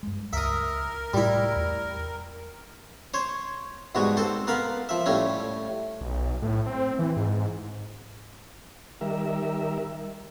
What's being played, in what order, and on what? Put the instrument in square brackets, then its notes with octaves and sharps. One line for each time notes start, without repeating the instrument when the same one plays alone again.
[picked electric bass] G2 G#3
[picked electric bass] C#2 [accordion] A#4 [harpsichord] D#5 E5
[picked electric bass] A2 C3 A3 [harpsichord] G3 E4
[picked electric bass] E2
[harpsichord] C5 C#5
G#2 B2 G3 G#3 F#4
C4 A4 C5
B3 A#4 F5 B5
F3 E5
A2 G3 A3 C#4
[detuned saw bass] B1
A2
C4
E3
G#2
[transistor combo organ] D#3 G3 A#4 E5